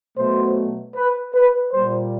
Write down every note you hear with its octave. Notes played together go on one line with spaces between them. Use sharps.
B2 F#3 A3 C5
B4
B4
A#2 G3 A#3 C5